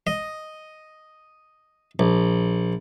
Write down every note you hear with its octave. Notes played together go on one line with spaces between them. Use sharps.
D#5
A#1